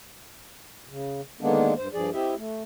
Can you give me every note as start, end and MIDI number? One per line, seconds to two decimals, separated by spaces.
0.89 1.21 49
1.41 1.74 50
1.41 1.74 51
1.41 1.74 56
1.41 1.74 58
1.41 1.74 59
1.41 1.74 62
1.77 1.88 43
1.77 1.88 72
1.93 2.10 43
1.93 2.10 53
1.93 2.10 68
1.93 2.10 74
2.13 2.35 60
2.13 2.35 64
2.13 2.35 67
2.13 2.35 75
2.13 2.35 76
2.36 2.63 57